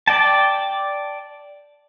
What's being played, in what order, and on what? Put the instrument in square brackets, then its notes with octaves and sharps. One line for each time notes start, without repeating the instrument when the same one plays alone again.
[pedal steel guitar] D5 G5 A5